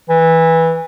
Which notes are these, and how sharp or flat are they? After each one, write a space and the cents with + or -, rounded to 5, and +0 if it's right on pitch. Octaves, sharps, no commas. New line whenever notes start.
E3 -10